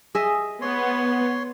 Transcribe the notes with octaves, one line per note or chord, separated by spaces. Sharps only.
G#4 D#5 E5
B3 C#5 C6